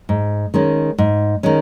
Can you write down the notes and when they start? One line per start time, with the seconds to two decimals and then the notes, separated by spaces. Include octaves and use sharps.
0.09 G#2
0.54 D#3 G#3 C#4
0.98 G#2
1.43 D#3 G#3 C#4